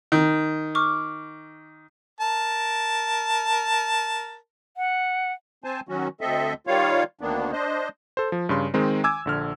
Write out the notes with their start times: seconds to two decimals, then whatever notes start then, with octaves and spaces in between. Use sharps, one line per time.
0.12 D#3
0.75 C#6 D6 F6
2.20 A#4 A5
4.77 F#5
5.64 C4 C5 G#5 A5
5.89 D#3 F#3 C#4 F#4
6.21 D2 C4 A4 D#5 E5
6.67 D#3 G3 F4 C#5 F5
7.21 D2 D#3 A#3 B3 D4
7.52 D4 C5 D#5
8.17 A4 C5
8.32 F3
8.49 G2 C#3 C6
8.74 D#3 G#3 C4 D#4
9.04 G#5 D6 E6 G#6
9.25 A#1 D3 F6